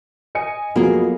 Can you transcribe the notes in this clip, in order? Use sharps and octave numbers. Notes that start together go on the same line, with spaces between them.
D#5 G#5 C#7
F2 F#3 A#3 B3 G#4